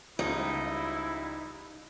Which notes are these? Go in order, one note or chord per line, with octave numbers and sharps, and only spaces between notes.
C#2 F3 G3 D#4 E4